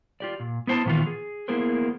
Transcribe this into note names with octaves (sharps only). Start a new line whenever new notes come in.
F4 G4 D5
A#2
B3 E4 C5 G5 A5
A#2 D#3 E3 B3 F4
G#4
A#3 B3 E4 G#4 A#4 C5